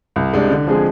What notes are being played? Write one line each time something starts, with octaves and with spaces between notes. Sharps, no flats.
C2
C3 G#3 D4
D3
F3 G#3 C4 G#4